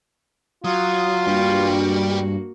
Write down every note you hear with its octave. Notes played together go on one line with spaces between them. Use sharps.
F#3 F4 D#6
G2 G3 A#3 F#4 G4